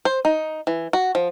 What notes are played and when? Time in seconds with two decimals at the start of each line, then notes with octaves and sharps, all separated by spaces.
0.05 C5
0.25 D#4
0.67 E3
0.93 F#4
1.15 F3